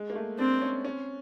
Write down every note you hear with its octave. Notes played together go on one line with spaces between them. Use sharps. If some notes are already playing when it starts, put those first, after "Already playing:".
Already playing: G#3
A#3
A3
C4 D4
C#4
C#4